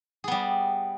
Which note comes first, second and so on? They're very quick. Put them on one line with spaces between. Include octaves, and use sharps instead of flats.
G#4 B3 G3